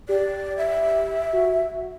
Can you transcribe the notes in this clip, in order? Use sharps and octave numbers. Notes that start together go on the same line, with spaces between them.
G4 D5
E5
F#4